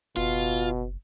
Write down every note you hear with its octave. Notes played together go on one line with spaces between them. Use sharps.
F#1 B2 F4